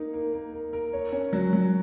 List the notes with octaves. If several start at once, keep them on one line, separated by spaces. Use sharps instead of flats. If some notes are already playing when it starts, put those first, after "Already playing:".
Already playing: A#3 D#4
A#3
A#3
A#3
A#4
C#5
C#4
F#3
F#3